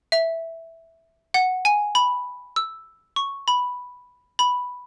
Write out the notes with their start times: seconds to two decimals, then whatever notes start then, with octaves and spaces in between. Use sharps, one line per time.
0.12 E5
1.34 F#5
1.65 G#5
1.95 B5
2.56 E6
3.16 C#6
3.48 B5
4.39 B5